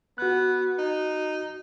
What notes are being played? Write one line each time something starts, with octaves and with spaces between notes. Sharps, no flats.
B3 F#4 F#6
D#4